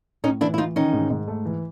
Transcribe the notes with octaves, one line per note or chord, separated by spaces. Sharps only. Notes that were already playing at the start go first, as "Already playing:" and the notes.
A2 C#4 D#4
E3 D4 E4
E4
E3 D#4 F4
D#3 C#4 D#4
G#2
G#2
A3
E3